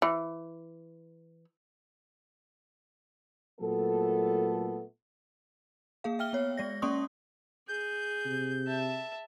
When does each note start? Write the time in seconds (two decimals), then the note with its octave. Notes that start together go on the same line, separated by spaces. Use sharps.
0.02 E3
3.61 A#2 F#3 A3 B3 A4
6.04 A#3 G#4 F5
6.19 E5 G5 F6 G7
6.33 B3 C#5
6.58 G#3 D5 A#6
6.82 A#3 C#4 D5 C6 C#6 D#6
7.68 G#4 G6
8.26 C3
8.67 E5 A5